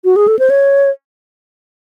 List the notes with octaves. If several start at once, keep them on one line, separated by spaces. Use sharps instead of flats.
F#4
G#4
A4
C5
C#5